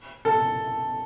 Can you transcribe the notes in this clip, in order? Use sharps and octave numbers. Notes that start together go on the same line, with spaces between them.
A4